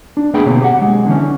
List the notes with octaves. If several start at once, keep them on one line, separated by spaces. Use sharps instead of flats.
D4
F#2 A3 B3 G#4 G5 B5
B2 D3 A#3 C4 C#5
G4 F#5
B1 G#3
D3 E3 C#4